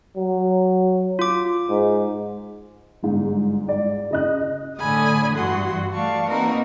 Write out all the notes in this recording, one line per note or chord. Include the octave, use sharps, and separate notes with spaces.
F#3
F4 D6
G#2
G1 G#2
D5
C#3 D#5 F#6
A2 D3 A3 G#5 B5 D#6
G2 E3 F#4 F#5 C6
E3 A3 D5 F5 A5 C#6
A#3 C4 D#4 F#4 A#4 B4